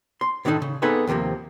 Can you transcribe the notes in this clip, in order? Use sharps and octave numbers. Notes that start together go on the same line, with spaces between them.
C6
A2 D3 D#3 D4 D#4 A4
C#3
B3 C4 D#4 G#4 A4 B4
D#2 C3 D#3 F3 A#3